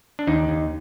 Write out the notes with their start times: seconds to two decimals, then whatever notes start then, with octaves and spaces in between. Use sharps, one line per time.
0.19 D4
0.27 D#2 D#4
0.49 D#2